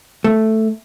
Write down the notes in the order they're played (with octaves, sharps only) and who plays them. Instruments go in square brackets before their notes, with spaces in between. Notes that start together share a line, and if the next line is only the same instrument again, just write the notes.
[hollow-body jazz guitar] A3